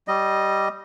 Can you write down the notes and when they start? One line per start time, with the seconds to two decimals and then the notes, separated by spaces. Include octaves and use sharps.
0.08 G3 D#5